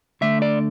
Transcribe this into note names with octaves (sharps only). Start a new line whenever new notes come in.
D3 A3 D4 E5
D5